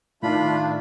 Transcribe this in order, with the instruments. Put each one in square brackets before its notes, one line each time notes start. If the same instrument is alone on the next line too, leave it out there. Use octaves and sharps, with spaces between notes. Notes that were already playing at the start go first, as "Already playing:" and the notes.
[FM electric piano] A2 D#3 [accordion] A3 D4 [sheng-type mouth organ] F4 B5